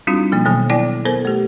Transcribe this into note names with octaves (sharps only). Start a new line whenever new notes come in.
G3 C4 D4 D#4 F4 F#4
B2 F3 A#3
B2 D#3 F#3 A#3 B3
B3 E4 D5 G5
B3 A4 A#4 C5
A3 G4